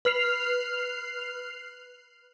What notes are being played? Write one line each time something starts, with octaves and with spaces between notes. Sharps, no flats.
B4 F6 C7 F7